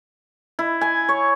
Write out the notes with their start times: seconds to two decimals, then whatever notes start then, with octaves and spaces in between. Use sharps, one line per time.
0.59 E4
0.81 G#5
1.09 C#5